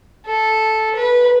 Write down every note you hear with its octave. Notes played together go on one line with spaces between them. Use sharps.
A4
B4